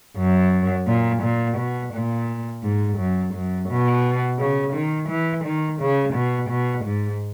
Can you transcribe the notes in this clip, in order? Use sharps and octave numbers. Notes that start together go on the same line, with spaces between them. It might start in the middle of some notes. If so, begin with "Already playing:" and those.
F#2
A#2
A#2
B2
A#2
G#2
F#2
F#2
B2
C#3
D#3
E3
D#3
C#3
B2
B2
G#2